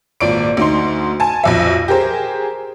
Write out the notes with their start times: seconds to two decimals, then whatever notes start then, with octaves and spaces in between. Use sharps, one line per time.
0.20 G#1 A#2 D5 D7
0.57 D2 D#4 C6
1.20 G#5 A5
1.43 B1 F2 E5
1.88 G4 G#4 A#4 C5